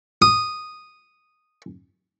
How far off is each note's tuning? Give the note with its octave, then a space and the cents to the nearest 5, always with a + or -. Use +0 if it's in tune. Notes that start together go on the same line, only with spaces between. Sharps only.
D#6 -5